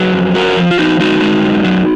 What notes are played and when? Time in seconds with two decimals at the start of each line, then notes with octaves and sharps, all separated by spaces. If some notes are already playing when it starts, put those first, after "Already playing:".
Already playing: F#3 G#4 B4
0.13 F2
0.35 F3 F#4 A#4
0.56 F3
0.71 F4
0.78 F3 D#4 F#4
1.00 G#3 D#4 F#4
1.21 G#3
1.43 F#2
1.65 F#3